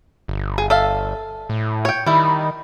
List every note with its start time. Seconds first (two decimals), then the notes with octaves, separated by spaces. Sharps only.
0.28 G1
0.58 G#4
0.70 A4 E5 F5
1.49 A2
1.85 C#5 G5
2.06 D#3 G3 E4